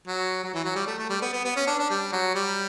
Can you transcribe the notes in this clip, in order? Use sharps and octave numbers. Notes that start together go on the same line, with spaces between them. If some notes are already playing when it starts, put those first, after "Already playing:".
F#3
F#3
E3
F#3
G3
A3
A3
G3
B3
B3
B3
C#4
D4
D4
G3
F#3
G3